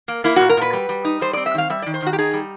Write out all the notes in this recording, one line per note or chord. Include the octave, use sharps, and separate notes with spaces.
A#3
A#3 E4
A#2 F#4
A#4
A#2 B4
G3
G3
D#4
G3 C5
C4 D5
E5
D#3 F5
G3 E5
D#3 D5
C5
D#3 F#4
G4
D#4 G#4
G3